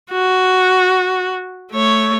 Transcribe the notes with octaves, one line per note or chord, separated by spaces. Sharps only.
F#4
A3 C#5